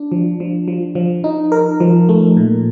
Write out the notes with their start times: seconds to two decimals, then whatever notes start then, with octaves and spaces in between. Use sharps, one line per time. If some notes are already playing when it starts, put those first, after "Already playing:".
Already playing: D4
0.12 F3
0.40 F3
0.68 F3
0.95 F3
1.24 D#4
1.52 A#4
1.80 F3
2.09 A3
2.37 A#2